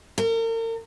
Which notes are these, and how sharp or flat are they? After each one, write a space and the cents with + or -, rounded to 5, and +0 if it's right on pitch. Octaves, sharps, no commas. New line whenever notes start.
A#4 -40